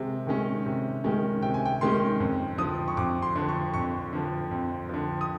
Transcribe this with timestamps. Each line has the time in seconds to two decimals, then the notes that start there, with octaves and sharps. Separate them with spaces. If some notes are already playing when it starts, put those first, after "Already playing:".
Already playing: C3 D#3 G#3
0.27 D#3 G#3 C#4
0.66 C3
1.04 D#3 G#3 C#4
1.42 C3 G5
1.54 G#5
1.65 G5
1.81 D#3 G#3 C#4 C6
2.20 F2
2.58 D3 F3 D#6
2.88 C#6
2.97 F2 D6
3.22 C6
3.36 D3 F3
3.49 C#6
3.74 F2 C#6
4.13 D3 F3
4.51 F2
4.89 D3 F3
5.21 D#6